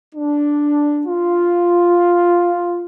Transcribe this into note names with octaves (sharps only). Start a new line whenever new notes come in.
D4
F4